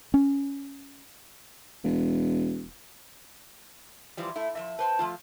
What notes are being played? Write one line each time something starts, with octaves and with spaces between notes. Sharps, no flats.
C#4
E1
E3 F3 G3
A3 E4
F3 G3 E5
B4 C5 G5 A5
F3 A3 F4